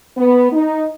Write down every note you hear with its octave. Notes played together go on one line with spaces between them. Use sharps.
B3
D#4